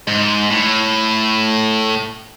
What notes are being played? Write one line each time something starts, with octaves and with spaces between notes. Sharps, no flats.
G#2
A2